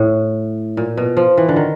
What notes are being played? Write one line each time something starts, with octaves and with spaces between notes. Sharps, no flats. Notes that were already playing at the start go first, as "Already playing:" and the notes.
Already playing: A2
A#2
B2
F3
E3
D3
D#3